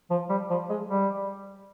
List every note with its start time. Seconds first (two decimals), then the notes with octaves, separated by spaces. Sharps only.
0.10 F3
0.30 G3
0.50 F3
0.70 G#3
0.89 G3